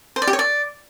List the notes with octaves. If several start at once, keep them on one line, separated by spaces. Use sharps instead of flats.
C5
D5
G4
C#5
D5